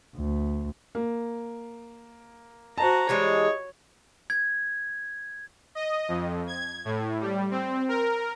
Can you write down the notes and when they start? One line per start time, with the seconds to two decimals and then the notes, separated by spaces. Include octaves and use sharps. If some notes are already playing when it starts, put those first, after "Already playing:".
0.15 D2
0.95 A#3
2.78 F#4 C5 A5 A#5
3.09 E3 G3 G#3 C#5
4.30 G#6
5.75 D#5
6.08 F2
6.47 G#6
6.85 A2
7.21 G3
7.51 C4
7.88 A#4